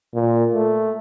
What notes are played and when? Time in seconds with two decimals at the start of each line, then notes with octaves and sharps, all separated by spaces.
0.14 A#2
0.54 A3